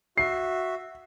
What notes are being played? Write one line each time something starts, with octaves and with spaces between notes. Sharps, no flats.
F#4 E5 C7